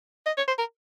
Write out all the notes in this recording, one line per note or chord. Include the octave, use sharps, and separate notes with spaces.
D#5
C#5
C5
A#4